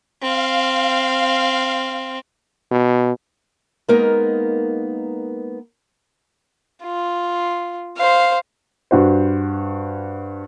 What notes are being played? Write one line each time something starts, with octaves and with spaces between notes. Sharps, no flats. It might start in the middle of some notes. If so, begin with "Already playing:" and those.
C4 F5
B2
G#3 A#3 B3 D#4 A#4
F4
C5 F5
G2 F#4 C5